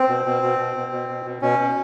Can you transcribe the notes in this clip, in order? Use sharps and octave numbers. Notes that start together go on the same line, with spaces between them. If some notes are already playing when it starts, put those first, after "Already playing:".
Already playing: C4
B2
B2
B2
B2
B2
B2
B2
B2
B2 C#4
B2